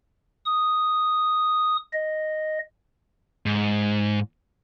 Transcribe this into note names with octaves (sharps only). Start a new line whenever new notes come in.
D#6
D#5
G#2